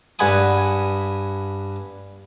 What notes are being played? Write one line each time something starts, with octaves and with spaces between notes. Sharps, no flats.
G2 F#5 G#5 B5 D#6